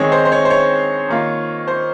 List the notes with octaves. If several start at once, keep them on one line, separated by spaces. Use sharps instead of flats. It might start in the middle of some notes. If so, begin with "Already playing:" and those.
Already playing: D#3 G#3 C4 D#4 C#5
C5
C5
C#5
C5
C#5
D#3 A#3 F4
C5